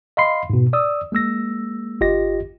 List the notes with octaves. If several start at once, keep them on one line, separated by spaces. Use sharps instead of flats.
D#5 F5 B5 C6 C7
G#2 B2
D5 D#6 E6
G#3 A#3 E6 A#6
G1 F4 G4 D#5 A#6